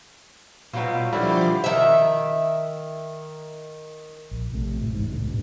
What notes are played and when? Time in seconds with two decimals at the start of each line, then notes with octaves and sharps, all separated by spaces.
0.73 B2 F#3 G3 D#4 F4
1.13 D3 D#3 F3 G3 E4 F#4 C6 D6
1.64 D#3 E5
4.31 A#1
4.51 A#1 C3 A3
4.80 F#2 A2
4.94 G#1 E2 G#2
5.11 B1 A2 C#3 A3
5.27 G2 A#2